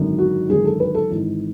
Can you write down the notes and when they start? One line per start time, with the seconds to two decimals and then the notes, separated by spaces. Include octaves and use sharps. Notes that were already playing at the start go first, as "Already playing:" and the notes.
Already playing: G#1 F#2 D3
0.18 F#4
0.49 G#1 F#2 D3 G#4
0.65 A4
0.80 B4
0.95 A4
1.09 G#1 G#2 E3